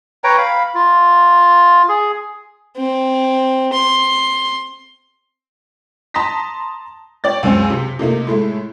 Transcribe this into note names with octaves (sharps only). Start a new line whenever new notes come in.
B4 C#5 G5 A#5
F5 B5
F4
G#4
C4
C6
A5 A#5 C6 D#6 A#6 B6
C#5 D5 G5 A6
C#2 F#2 G#3 C4 G#5
C3
C3 A3 A#3 D#4
A2 G#3 A3 E4